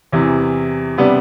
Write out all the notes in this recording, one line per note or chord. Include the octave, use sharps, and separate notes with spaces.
E2 C3 E3
C3 G3 B3 D4